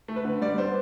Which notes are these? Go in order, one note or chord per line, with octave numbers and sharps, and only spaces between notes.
A3
B4
D3
G3 D5
B3 C5